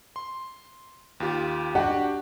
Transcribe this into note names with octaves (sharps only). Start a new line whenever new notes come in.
C6
D#2 F4 G4
D4 F#4 G4 F#5